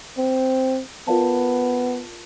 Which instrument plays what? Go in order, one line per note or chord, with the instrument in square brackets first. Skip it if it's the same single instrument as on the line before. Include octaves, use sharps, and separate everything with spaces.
[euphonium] C4
[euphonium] B3 [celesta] F4 A#4 D5 F5 A5